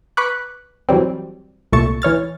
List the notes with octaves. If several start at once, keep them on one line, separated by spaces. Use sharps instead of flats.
B4 B5 C#6 D6 F#6
E3 F#3 G3 C4
C2 A#2 A3 C#6 A6 E7
E3 C#5 F6 A6